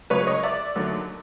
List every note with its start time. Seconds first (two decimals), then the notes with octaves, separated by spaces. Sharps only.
0.10 C#2 C#3 F#3 B4 C#5
0.27 C#5 D#5
0.43 D5 E5
0.76 D#2 D3 F#3